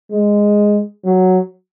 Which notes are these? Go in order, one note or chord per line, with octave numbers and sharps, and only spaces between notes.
G#3
F#3